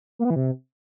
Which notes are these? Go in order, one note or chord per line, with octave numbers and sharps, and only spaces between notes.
A#3
B3
E3
C3